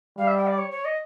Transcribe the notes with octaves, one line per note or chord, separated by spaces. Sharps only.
G3 F5
E5
G5
D5
C#5
C#5
D#5